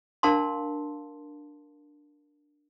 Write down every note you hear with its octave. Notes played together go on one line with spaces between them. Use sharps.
D4 A#4 F5 A5 C6